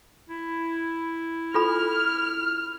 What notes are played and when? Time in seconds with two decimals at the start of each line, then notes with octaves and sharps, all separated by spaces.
0.30 E4
1.54 F4 A4 B5 F6